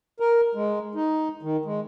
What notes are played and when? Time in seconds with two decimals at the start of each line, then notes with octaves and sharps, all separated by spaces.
0.20 A#4
0.55 G#3
0.95 D#4
1.42 D#3
1.65 G#3